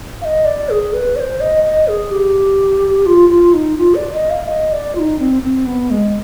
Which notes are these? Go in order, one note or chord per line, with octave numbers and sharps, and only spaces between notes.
F5
D#5
D5
G#4
B4
D5
C5
D#5
D#5
G#4
G4
F4
F4
D#4
F4
D5
D#5
F5
D#5
D5
F4
D#4
C4
C4
B3
G#3